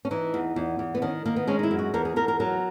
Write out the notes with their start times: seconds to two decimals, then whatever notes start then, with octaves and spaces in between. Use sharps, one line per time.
0.05 C#4
0.11 E3 D#4
0.34 E2
0.56 E2
0.79 E2
0.95 B3
1.02 D#3 C#4
1.25 D#3 A#3
1.36 B3
1.47 G#3 C#4
1.59 D#4
1.63 E4
1.71 F#2
1.79 F#4
1.94 E2 A#4
2.05 G#4
2.16 E2 A#4
2.28 A#4
2.40 F#3 A#4